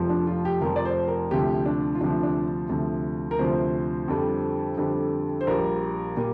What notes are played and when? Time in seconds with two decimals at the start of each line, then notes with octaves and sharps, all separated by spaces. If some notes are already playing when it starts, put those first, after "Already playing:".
Already playing: F1 F2 F3
0.10 D4
0.27 F4
0.45 G4
0.61 F1 F2 F3 A#4
0.76 D5
0.85 C5
1.08 A#4
1.31 D2 C3 F3 G4
1.66 D4
1.95 F4
2.01 D2 C3 F3 D4
2.23 D4
2.69 D2 C3 F3
3.31 A#4
3.39 D2 C3 F3 C5
4.08 F2 D3 G3
4.77 F2 D3 G3
5.41 C5
5.47 A#1 A#2 G3 A#4
6.17 A#2 G3